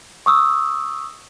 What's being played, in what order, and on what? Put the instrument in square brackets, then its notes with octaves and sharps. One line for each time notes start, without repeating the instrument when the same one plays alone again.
[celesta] C#6 D#6 E6